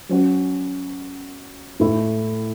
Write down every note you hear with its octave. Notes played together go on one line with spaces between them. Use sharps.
F#3 C#4 F#4
A2 A3 E4